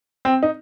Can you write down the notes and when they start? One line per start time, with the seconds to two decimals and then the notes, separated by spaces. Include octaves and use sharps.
0.25 C4
0.43 D#4